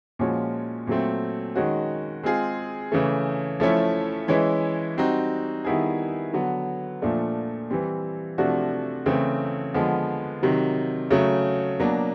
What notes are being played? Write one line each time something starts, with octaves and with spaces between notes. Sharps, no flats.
A#2 F3 G#3 C#4 F#4
A#2 F#3 A3 C4
D#3 G#3 C#4 F#4
G#3 C4 F4 G#4
C#3 E3 A3
F3 A3 C#4 E4
E3 G#3 C#4 E4
G3 C4 D#4 F#4
D#3 G3 B3 E4 G#4
D3 F#3 B3
A#2 F3 A3 D4
E3 G3 C4
C3 F3 A3 D4 F#4
C#3 E3 A3 C4
D3 F3 G#3 B3
C3 D#3 F#3
C#3 F#3 A3
B2 F#3 A#3 D4